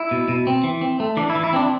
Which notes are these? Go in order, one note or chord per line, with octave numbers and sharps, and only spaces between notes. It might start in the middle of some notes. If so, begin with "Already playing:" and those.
Already playing: E4
B2
B2
C4
E3
C4
A3
E3 D4
E4
E3
E4
C4 D4